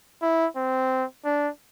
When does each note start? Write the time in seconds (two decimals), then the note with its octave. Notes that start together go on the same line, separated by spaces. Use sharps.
0.22 E4
0.56 C4
1.25 D4